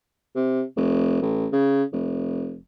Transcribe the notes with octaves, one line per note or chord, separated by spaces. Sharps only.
C3
F1
A1
C#3
F1